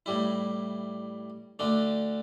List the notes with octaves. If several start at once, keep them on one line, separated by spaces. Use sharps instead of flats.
A2 G3 E4
D2 D3 A3 D4